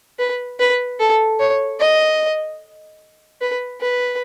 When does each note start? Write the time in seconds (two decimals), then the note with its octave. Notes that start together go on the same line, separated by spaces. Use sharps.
0.19 B4
0.59 B4
1.00 A4
1.40 C#5
1.80 D#5
3.41 B4
3.81 B4